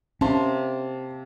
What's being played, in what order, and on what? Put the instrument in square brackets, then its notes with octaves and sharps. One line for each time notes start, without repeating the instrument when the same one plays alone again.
[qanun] C3 A#3 [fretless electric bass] C#4 [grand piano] A5 C6